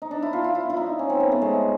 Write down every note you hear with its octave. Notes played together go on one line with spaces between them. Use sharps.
D#4
D4
E4
F4
F4
E4
E4
D#4
C#4
C4
B3
A3
G#3